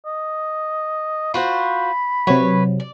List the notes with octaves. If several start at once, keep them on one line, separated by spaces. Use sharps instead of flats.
D#5
F4 F#4 C5 B5
C3 F#3 B4 C#5
D5